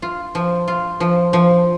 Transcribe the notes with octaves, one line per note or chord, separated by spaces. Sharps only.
F4
F3
F4
F3
F3